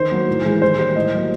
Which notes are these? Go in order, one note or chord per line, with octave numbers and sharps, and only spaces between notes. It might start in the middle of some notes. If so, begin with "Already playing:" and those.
Already playing: D#3 C5
F#3 A#3
A2
E3 G#3
D#3 C5
G3 A#3
A2 D#5
F#3 A#3